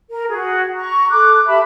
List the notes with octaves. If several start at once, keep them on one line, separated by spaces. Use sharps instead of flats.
A#4
F#4 G#4
A#5 C#6
A4 D6 F#6
G4 E5 A5 B5